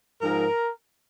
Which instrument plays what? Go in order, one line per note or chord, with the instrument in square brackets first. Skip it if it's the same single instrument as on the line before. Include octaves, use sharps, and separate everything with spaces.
[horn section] G#2 F3 A#4